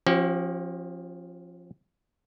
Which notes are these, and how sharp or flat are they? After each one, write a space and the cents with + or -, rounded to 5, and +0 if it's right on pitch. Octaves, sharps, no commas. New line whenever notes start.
F3 +0 C#4 -45 G4 -45